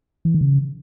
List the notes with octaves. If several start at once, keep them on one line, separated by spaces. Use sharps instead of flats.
E3
D#3
C#3